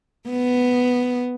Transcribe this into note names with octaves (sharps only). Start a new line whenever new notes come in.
B3